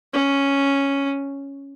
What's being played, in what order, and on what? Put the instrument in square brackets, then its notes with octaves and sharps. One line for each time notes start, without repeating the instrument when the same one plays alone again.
[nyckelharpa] C#4